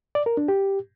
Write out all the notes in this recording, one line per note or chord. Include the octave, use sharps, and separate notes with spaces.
D5
A#4
D4
G4